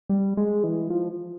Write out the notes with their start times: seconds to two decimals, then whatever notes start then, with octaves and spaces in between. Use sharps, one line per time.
0.09 G3
0.37 G#3
0.64 E3
0.90 F3